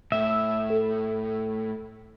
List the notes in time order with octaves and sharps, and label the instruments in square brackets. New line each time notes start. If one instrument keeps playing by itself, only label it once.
[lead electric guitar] A2 [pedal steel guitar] E5
[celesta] A4